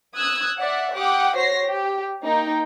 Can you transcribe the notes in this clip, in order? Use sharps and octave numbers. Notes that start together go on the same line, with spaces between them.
D#6 E6 F#6 G#6
D5 E5 F#5
G4 F#5 G5 D6 D#6
F#4 C5 C#5 A#6 C7
G4
A#3 D#4 G5